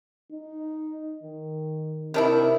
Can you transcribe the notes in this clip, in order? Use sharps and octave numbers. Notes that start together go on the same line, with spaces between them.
D#4
D#3
C3 D#3 D4 E4